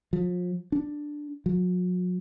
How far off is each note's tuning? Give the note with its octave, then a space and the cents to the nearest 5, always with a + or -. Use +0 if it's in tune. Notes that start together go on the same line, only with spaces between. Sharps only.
F3 +35
D4 +5
F#3 -40